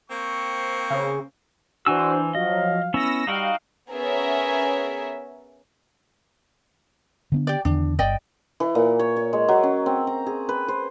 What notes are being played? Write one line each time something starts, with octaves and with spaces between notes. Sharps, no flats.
A#3 C4 C#6
C#3
E3 D4 F#4 C5 G#5 E6
F3 F#3 D#5 F5
B3 C#4 E4 E6 A#6
G3 D#4 F#4 F5 G5
B3 C#4 G#4 A#4 C#5 E5
D3 B3 D4
G4 D5
E2 D3 D#3 D4
G1 D5 D#5 G5
E3
A#2
C#5
C#5
G#3
F#3
C#4
C4
A#5
G#4
B4
C5